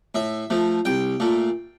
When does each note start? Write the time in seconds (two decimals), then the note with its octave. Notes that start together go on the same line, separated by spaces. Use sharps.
0.15 A2 E5
0.50 F3 A3
0.85 C2 G5
1.20 A#2 A3